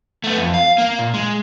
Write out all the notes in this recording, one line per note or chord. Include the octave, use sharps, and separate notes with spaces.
A3 B3
F2
F5
A#3
A#2
G#3